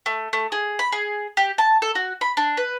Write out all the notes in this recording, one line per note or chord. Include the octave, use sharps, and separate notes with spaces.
A3
A3
G#4
B5
G#4
G4
A5
A4
F#4
B5
D4
B4